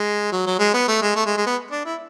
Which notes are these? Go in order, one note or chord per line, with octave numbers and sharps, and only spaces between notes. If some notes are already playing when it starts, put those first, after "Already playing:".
Already playing: G#3
F#3
F#3
G#3
B3
A3
G#3
A3
G#3
G#3
B3
D4
E4